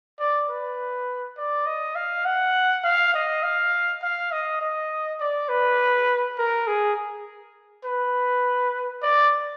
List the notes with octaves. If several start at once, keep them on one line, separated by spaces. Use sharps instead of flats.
D5
B4
D5
D#5
F5
F#5
F5
D#5
F5
F5
D#5
D#5
D5
B4
A#4
G#4
B4
D5